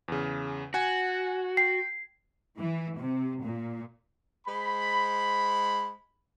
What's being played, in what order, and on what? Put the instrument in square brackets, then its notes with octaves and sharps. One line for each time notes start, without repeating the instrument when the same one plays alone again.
[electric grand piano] E2 C#3
[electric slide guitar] F#4 [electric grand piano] F#5 G#5 G#6
[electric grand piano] G5 [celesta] C7
[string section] E3
C3
A#2
[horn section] G#3 C5 B5